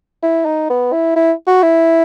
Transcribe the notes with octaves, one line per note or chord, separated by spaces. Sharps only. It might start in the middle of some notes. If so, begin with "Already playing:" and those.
E4
D#4
B3
E4
E4
F#4
E4